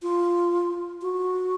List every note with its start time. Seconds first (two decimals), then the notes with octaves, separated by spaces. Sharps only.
0.02 F4
1.02 F#4